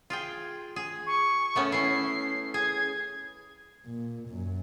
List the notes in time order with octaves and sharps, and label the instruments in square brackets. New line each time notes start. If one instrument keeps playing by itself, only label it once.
[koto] F4 G#4 G5
G#4
[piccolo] C#6
[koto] A3 B3 C#4
[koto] C#4 E4 [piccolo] C7
[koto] G#4 [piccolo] G#6
[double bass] A#2
F#2